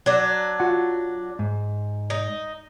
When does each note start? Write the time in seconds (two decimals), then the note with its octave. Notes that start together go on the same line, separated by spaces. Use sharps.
0.06 F#3 D4
0.60 F4 F#4 F#5
1.39 G#2
2.10 D#4